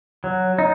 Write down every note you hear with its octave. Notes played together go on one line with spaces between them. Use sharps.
F#3
D#4